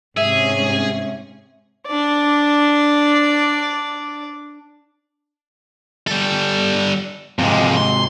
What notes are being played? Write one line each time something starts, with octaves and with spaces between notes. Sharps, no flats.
G#2 C3 C#4 G#4 E5
D4 D5
G3 A4
F2 G#2 C3 G#3
C6